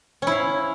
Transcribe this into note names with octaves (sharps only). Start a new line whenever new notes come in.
C#4 E4 F5